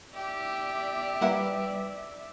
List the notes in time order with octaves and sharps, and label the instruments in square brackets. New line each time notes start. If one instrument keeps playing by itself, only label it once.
[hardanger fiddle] G4 [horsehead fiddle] D5 E5
[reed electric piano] G3 B4 [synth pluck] A#3 E4 F#5